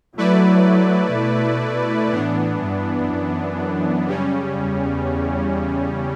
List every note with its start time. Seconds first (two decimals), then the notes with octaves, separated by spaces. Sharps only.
0.17 F#3 A3 E4 B4 D5
1.14 B2
2.12 A2 E3 B3 D4
2.60 G2
3.09 F#2
4.07 C#3 G3 C#4
4.55 E2